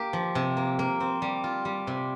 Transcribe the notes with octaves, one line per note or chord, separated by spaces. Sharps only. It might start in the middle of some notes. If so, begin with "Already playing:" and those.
Already playing: A#3 G4
F3
C3
A#3
A#3
C4
G3
F4
G3
C3